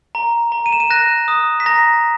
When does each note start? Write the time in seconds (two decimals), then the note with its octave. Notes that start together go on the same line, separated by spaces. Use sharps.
0.15 A#5
0.52 A#5
0.66 D#7
0.72 E7
0.80 D#7
0.90 F#6 A#6
1.28 D#6
1.60 B6
1.66 A#5 A#6